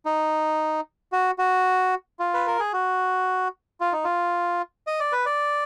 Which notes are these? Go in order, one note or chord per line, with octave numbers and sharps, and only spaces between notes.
D#4
F#4
F#4
F4
B4
A#4
G#4
F#4
F4
D#4
F4
D#5
D5
B4
D5